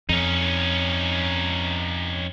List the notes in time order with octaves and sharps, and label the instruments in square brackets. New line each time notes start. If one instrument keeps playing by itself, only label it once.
[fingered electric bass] F2 [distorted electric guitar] C#4 D#4